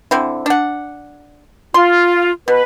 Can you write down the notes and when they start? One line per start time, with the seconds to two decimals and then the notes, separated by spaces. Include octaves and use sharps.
0.11 D3 C4 E4
0.46 D4 F#5
1.74 F4 C6
2.48 B2 B4